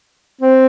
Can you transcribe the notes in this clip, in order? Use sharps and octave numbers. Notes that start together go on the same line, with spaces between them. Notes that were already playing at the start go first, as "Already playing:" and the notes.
C4